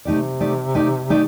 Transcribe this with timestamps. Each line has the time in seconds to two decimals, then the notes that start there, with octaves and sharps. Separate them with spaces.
0.05 C3 A3 D#4 G4 D5
0.40 A3 D#4 G4 D5
0.74 A3 D#4 G4 D5
1.10 A3 D#4 G4 D5